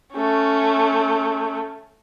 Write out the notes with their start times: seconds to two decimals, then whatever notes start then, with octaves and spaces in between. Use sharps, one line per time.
0.13 A3 C#4